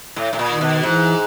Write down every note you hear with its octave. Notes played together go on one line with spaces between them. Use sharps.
A2
A2
A#2
D#3
B2
G#2 E3